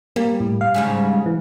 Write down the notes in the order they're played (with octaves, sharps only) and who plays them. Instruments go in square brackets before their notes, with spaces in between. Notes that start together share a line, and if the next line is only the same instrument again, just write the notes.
[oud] G3 [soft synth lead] A#3
[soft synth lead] A2
F5
[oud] G#2 C#3 G3
[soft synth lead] E3